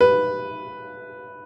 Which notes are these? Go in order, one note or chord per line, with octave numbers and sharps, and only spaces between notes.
B4